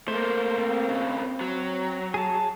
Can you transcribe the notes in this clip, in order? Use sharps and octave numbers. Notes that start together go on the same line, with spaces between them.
A3 A#3 C5
C4
D#2 C#3
F#3
G#4 A5